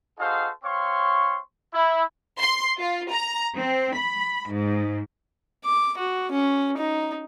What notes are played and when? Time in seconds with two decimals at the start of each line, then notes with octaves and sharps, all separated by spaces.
0.19 D#4 F#4 G#4 A4 C5 F5
0.64 C4 C#5 F5 C6 C#6
1.74 E4
2.40 C6
2.79 F4
3.12 A#5
3.58 C4
3.95 B5
4.52 G#2
5.64 D6
5.98 F#4
6.31 C#4
6.78 D#4